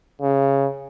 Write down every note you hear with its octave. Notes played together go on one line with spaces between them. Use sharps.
C#3